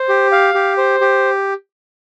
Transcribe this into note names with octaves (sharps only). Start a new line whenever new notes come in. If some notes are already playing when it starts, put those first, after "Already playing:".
Already playing: C5
G4
F5
G4
C5
G4